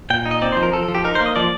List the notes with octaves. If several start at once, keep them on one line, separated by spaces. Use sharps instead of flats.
A#2 G5
D#4
D#5
C4 D5
F3 C5
A#4
F3 A4
A4
F3
G4
D#4 A#4
C5
A#3
D#5
F3 D5